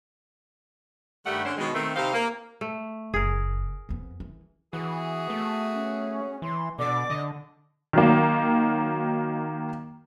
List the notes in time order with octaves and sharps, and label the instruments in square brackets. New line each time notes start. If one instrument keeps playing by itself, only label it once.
[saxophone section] G2 D#3 G3 A3 G4 F#5
D3 C#4 C5
B2 D#3 G#3
D#3 A3 C4
C3 G3 D#4 C5 F5
A#3
[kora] A3
[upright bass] F#1 [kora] G#4 A#4
[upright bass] F2 B3
E3
[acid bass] E3 [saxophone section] B3 F#4 G#4
[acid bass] A3
[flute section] C#4
[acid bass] E3 [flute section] C6
[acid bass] B2 [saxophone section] D3 [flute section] D5 D6
[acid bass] D3 [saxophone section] D#5
[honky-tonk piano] D#3 F#3 A#3